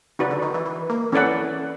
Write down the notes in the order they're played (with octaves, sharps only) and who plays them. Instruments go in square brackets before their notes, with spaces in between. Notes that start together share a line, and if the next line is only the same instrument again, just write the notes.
[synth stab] C#3 [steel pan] D#4 F#4 B4 D5
[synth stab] D3
D#3
E3
E3
A#3
[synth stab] E3 [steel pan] C#4 E4 A4 D5 F#5